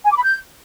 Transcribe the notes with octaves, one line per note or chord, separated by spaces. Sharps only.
G#5
D6
B5
G6